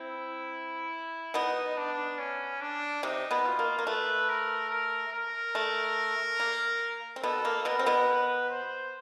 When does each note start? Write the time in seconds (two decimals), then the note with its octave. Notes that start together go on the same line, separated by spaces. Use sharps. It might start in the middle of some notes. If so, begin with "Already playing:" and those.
Already playing: C4 E4
1.34 B2 B3 D#4
1.77 D4
2.19 C#4
2.61 D4
3.03 C3 C4 D#4
3.31 B2 B3
3.45 F4
3.59 A#3
3.79 A#3
3.87 A3 B4
4.29 A#4
4.71 A#4
5.13 A#4
5.55 A3
6.40 A#3
7.16 C4
7.23 B2 B3 A4
7.45 A#3
7.65 B2 B3 A#4
7.79 C4
7.86 B2 B3
8.08 B4
8.49 C5